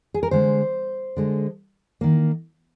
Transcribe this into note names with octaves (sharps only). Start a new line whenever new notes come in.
G#4
A#4
D3 G#3 C5
D3 G#3
D#3 A#3